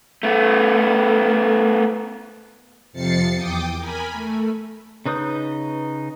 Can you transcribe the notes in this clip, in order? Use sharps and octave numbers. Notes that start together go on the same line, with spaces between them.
A3 B3
F2 C3 F3 A6 C7 C#7
E2 G5 D6 D#6
A#4 G#5 B5
A3
C#3 D#4 B4 D#6 G6